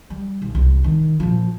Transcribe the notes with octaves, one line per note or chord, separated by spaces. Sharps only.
G3
B1
C2
D#3
A#2 F3